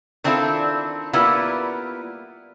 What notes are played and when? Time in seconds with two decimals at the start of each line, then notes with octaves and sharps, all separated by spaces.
0.24 D#3 C4 D4 E4 F4 A4
1.13 G3 A#3 B3 E4 F4